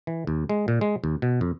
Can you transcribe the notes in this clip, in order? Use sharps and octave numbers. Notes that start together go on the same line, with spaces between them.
E3
D#2
G#3
A#2
G#3
D#2
B2
F2